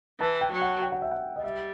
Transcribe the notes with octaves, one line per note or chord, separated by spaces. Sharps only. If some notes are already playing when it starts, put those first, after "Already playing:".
E3 A5
G5
F#3
F#5
G5
F#5
E5
F#5
D#5
G3 E5